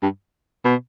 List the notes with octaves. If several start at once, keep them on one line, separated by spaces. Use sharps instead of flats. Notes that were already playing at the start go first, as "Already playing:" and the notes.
G2
B2